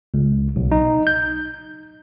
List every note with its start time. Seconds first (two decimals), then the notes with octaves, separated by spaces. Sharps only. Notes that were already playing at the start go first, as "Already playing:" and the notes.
0.14 C#2
0.56 B1
0.71 D#4
1.07 G6